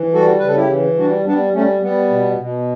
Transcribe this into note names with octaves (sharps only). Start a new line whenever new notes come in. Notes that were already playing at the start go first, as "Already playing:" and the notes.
Already playing: E3
G3 F#4 A4
C#3 B4
A4
E4 G4
E3
G3 D4 F#4
G3 B3 D4
G3 A3 C#4
G3 B3
B2
B2